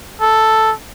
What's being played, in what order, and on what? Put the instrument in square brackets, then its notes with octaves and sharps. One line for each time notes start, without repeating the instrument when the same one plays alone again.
[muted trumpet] A4